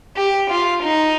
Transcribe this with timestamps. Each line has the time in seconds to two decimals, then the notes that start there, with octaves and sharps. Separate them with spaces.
0.16 G4
0.50 F4
0.83 D#4